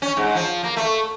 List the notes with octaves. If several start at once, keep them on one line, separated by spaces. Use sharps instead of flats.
C#4
G#2
F3
A#3
A3